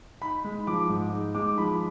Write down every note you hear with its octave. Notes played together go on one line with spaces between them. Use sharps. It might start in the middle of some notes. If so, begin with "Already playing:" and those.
D#4 B5
G#3
F3 D6
G#2
D#4
G#3 D6
F3 B5